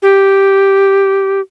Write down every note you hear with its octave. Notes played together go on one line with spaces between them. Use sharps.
G4